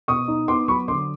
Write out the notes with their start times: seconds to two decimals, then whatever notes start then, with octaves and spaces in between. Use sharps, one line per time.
0.08 B2 C#6 D#6
0.28 D#4
0.48 B3 C6 D6
0.68 F#3 B5 C#6
0.88 D3 C6 D6